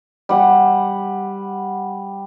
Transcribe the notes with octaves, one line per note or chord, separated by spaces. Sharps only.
G3 F#5